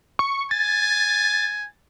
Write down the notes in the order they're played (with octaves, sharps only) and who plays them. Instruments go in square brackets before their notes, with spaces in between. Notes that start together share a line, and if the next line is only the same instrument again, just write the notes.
[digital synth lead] C#6
[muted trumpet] G#5 [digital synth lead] A6